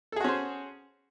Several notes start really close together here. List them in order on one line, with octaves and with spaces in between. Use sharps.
A4 G#4 F#4 C#4 C5